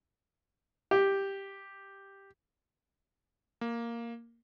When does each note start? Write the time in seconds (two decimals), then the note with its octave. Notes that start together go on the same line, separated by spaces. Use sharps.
0.91 G4
3.61 A#3